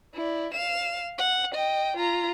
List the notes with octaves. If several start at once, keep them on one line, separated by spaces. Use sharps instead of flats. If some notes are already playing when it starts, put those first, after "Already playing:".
E4 D5
F5 E7
F#5
D#5 G5
F4 A#5